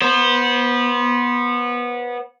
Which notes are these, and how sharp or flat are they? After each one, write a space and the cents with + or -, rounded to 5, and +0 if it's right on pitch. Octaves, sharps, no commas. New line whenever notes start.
B3 -20 C5 +0